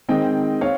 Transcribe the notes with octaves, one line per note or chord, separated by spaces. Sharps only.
D#3 G#3 C4 D#5 G5
C4 C#5 F5